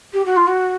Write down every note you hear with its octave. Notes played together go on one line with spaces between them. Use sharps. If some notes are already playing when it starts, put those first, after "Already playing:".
G4
F#4
F4
F#4